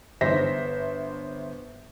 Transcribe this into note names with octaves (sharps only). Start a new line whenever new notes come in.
G1 C5 E5 A#6 B6